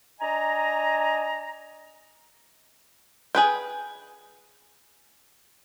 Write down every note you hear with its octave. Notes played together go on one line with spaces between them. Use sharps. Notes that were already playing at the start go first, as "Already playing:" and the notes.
D4 D#5 G#5 A#5
G#4 B4 G5